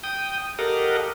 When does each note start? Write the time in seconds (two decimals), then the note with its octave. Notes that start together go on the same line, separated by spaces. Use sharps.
0.04 G5 D#6
0.59 G4 A4 A#4 D#5 F5 F#5